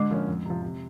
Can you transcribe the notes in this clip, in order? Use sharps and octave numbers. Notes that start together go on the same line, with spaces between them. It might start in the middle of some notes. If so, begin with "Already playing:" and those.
Already playing: D3 G#3
F3 A#3 C#4
F2
C3 F3
C3